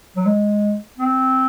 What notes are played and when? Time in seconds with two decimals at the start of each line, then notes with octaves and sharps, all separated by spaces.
0.16 F#3
0.26 G#3
0.99 C4